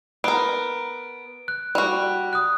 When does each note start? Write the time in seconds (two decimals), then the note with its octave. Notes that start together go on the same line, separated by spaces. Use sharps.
0.24 B3 A#4 D7
1.48 F#6
1.75 G3 F#4
2.33 D#6 F#6